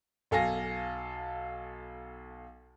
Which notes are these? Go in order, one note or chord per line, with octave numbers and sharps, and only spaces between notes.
B1 A4 F5 G#5 A#6